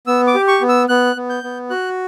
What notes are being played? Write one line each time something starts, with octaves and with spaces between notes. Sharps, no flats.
B3 E6
D6
G4
C#6
B3
E6
B3 F#6
B3
G6
B3
F#4 F#6